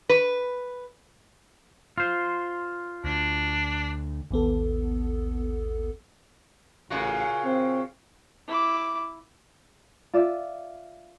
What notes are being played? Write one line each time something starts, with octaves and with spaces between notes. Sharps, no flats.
B4
F4 C5
D2 D4
A1 D#2 B3 A4
A1 A#2 C#3 F#4
C4
E4 D6
F4 D5 E5